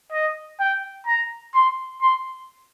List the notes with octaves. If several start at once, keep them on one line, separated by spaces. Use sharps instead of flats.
D#5
G5
A#5
C6
C6